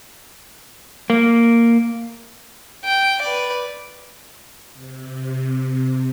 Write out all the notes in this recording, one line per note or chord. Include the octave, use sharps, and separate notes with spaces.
A#3
G5
B4 D5
C3